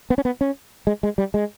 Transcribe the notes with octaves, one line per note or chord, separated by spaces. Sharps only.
B3
C#4
B3
C#4
G#3
G#3
G3
G#3